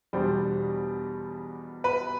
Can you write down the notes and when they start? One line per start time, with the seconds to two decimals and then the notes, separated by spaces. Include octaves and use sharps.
0.13 E2 B2 G3 D4 C5
1.84 B4